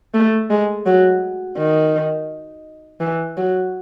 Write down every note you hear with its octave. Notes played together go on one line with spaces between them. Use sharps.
A3
G#3
F#3
D#3
E3
F#3